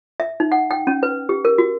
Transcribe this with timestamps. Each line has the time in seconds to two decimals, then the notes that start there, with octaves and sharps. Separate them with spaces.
0.20 E5
0.40 D#4
0.52 F#5
0.71 G5
0.87 C#4
1.03 B4
1.29 G4
1.45 A#4
1.58 F#4